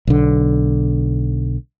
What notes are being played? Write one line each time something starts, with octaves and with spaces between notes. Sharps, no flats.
B1 D3